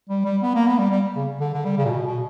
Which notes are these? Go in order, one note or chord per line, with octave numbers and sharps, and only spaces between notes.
G3
G3
B3
A#3
B3
G3
G3
C#3
D3
D3
G3
C#3
A#2
B2
B2